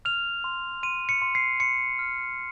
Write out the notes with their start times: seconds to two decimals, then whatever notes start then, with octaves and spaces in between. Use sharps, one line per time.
0.05 F6 F7
0.44 C6
0.83 C6 D#7
1.09 C#7
1.22 C6
1.35 C7
1.60 C6 C#7
1.99 F6